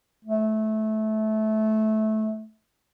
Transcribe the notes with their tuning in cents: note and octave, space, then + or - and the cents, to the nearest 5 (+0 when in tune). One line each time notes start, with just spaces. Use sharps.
A3 -20